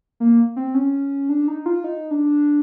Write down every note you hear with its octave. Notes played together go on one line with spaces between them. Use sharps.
A#3
C4
C#4
D4
D#4
F4
D#4
D4